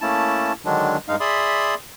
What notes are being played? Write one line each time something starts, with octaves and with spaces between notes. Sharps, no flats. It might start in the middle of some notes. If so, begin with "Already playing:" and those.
A3 A#3 C#4 E4 A5
D3 D#3 F#3 G#3 D4
G2 G#3 D#4 F5
G#4 D5 E5 B5 C6 D#6